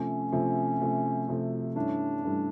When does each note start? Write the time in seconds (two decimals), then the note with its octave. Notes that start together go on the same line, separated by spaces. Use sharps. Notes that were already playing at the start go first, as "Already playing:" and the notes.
Already playing: C3 F3 A3 C#4
0.32 C3 F3 A3
0.81 C3 F3 A3
1.28 C3 F3 A3
1.76 G2 E3 A3 C#4 D4 E4
2.23 G2 E3 A3 C#4 E4